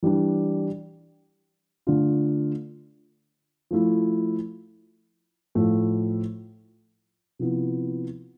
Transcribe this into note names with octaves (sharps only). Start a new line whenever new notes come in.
E3 G3 D4
D3 A3 D4 F4
F3 A3 E4
A2 F3 A3 E4
C3 F3 B3 E4